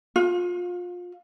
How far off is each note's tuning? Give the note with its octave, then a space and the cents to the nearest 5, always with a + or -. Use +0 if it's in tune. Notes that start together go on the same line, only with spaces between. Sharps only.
F4 +25